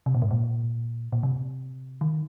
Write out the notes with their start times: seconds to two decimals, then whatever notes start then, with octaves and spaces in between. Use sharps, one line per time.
0.06 C3
0.14 A#2
0.22 G#2
0.31 A#2
1.12 A#2
1.23 C3
2.01 D#3